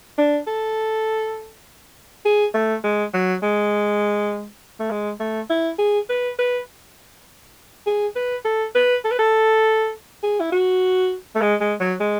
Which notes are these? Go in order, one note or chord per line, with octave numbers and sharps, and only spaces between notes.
D4
A4
G#4
A3
G#3
F#3
G#3
A3
G#3
A3
E4
G#4
B4
B4
G#4
B4
A4
B4
A4
B4
A4
G#4
E4
F#4
A3
G#3
G#3
F#3
G#3